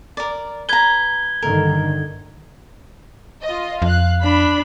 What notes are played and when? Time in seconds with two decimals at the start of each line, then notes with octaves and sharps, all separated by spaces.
0.17 A#4 D5
0.69 B4 A#5 G#6 G7
1.42 G2 D3 D#3 A#4
3.44 F4 D#5
3.82 F2 F5 F#6
4.23 D4 B5